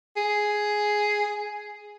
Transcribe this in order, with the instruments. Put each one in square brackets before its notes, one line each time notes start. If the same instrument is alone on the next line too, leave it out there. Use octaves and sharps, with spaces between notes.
[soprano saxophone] G#4